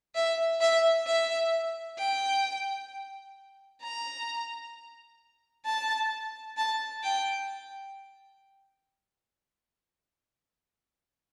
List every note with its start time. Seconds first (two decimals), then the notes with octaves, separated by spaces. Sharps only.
0.15 E5
0.61 E5
1.07 E5
1.98 G5
3.82 A#5
5.65 A5
6.57 A5
7.03 G5